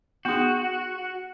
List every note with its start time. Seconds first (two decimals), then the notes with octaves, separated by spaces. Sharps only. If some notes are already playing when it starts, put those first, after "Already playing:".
0.25 B3 D#4 F#4 G#4